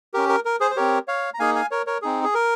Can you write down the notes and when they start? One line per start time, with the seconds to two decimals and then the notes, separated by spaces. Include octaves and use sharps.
0.14 C#4 G4 A#4
0.29 A#4
0.45 A#4
0.60 G#4 C5
0.71 C5
0.76 C4 G4 A#4 C#5
1.08 C#5 F5
1.34 A#5
1.39 A#3 D#4 G#4 F5 G#5
1.55 F5 G#5
1.71 A#4 C#5
1.87 A#4 C#5
2.02 C4 D#4 G#4
2.24 G#4
2.35 A#4